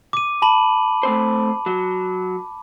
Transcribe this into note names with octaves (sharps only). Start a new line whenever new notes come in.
D6 D#7
A5 B5 F#7
A3 C4 C5
F#3